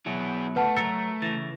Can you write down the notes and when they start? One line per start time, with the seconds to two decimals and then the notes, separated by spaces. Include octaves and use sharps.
0.06 B2 F#3 E4 G#4
0.56 A3 B4 F#5 A5
0.77 F#3 A#4 E6 A6 C#7
1.22 C#3 E3 A6 A#6